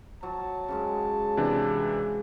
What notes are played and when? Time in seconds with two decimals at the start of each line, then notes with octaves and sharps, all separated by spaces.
0.23 F#3 A5
0.68 C#3 F#3 G#3
1.37 C3 E3 D4